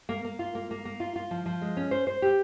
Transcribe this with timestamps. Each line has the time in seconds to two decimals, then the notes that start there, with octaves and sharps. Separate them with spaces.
0.09 A#3
0.24 A#3
0.39 F4
0.55 A#3
0.71 A#3
0.85 A#3
1.00 F4
1.16 F4
1.31 F3
1.46 F3
1.61 G#3
1.77 C#4
1.91 C5
2.07 C5
2.22 G4